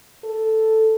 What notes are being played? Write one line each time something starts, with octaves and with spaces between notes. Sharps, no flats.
A4